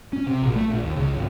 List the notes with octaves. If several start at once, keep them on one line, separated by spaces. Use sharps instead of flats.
C#4
C3
A#1
A3
A#1
D#2
C#2
G#1